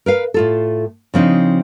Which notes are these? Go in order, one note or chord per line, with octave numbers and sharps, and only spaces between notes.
A#4 B4 F5
A2 F4 A4
C#3 F3 C4 D4 D#4